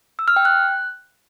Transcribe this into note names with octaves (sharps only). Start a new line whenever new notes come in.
E6
F6
G5
F#6